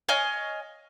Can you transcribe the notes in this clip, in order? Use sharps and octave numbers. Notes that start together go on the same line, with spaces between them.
C#5 D#5 F5 G#5